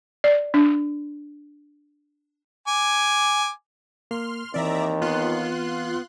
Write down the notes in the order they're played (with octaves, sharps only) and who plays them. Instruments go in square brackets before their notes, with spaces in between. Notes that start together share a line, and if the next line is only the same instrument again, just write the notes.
[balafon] D5
D4
[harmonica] G#5 D6
[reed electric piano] A#3 [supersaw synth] C6 F6
[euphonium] D#2 [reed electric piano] E3 C4 [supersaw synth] D5 E5 A#5
[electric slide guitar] B3 [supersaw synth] F4 C6 F#6